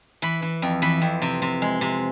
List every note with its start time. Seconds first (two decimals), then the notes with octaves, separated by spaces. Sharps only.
0.22 E3 B5
0.42 E3
0.62 F2
0.82 E3 B5
1.02 F2
1.22 C3
1.42 C3
1.62 G#3
1.81 C3